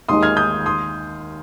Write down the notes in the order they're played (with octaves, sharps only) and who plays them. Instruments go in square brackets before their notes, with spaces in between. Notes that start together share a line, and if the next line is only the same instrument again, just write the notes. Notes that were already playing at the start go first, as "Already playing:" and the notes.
[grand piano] D#2 D#3 G#3 D#4 [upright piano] C6 D#6
[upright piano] F6 G#6
D#6 G6
C6 D#6